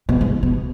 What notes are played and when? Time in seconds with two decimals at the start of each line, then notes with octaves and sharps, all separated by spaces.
0.09 B2
0.21 G#2
0.43 B2